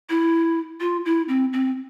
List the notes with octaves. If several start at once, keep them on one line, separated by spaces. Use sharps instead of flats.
E4
F4
E4
C4
C4